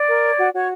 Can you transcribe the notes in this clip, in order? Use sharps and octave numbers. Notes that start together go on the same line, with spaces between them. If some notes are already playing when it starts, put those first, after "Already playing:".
Already playing: D5
A#4
C#5
F#4
F#4 C#5